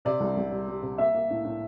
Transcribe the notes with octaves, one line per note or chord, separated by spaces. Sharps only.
C3 D5
C2
C2
G3
G3
C3
A#3 E5
A#3
A2
A2